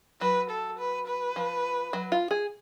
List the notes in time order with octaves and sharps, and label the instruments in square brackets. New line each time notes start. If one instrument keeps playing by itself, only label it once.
[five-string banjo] F#3 [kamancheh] B4
[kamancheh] A4
B4
B4
[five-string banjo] F3
F#3
F4
G#4